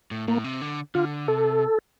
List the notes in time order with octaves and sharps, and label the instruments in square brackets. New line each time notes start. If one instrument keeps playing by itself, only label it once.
[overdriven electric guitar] A2
[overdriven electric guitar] A2 [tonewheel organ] A#3
[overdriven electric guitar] C3
D3
[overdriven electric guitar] D3 [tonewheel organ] F4
[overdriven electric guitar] C3 [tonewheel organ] A4